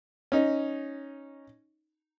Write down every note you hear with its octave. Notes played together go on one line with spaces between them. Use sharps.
C#4 D#4